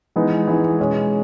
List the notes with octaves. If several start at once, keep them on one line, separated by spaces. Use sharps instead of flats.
E3 G#3 B3 D#4
E3 G#3 B3 D#4
B2 G#3 C#4 G#4 C#5